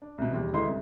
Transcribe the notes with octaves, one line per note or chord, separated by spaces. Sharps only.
D4
C2 B2
E1 D#2 G3
G1 D2 G#3 E4 D#5 C6
C2 G2